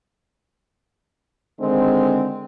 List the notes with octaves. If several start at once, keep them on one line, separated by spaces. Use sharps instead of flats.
D3 D#3 G#3 C4